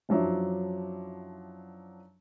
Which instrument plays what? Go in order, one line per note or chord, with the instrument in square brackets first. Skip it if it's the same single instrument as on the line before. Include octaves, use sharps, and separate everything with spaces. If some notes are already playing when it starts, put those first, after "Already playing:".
[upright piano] F#2 F3 F#3 D4 E4